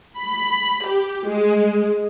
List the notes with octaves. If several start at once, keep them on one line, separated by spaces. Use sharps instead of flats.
B5
G4
G#3